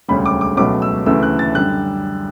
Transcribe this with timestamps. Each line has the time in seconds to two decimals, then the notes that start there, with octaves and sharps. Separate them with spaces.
0.08 E1 D2 C#3 G3 B5
0.26 D6
0.41 D6
0.57 C#2 B2 F#3 A3 D6
0.82 E6
1.06 D2 C#3 E3 A3 E6
1.23 F#6
1.39 A6
1.55 F#2 D3 G3 F#6